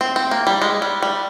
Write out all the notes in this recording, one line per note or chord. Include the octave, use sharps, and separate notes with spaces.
C4
C4
A#3
G3
G#3
G3
G3